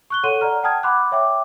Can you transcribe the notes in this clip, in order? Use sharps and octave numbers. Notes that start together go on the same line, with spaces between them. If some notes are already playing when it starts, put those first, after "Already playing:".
C#6 F#6 G7
A4 C#5 F#5 C6 D#7
D5 F#5 A#5 F6
F#5 G5 A5 D#6 F6 G#6
F#5 B5 C6 D6 F#6
C#5 E5 G5 D6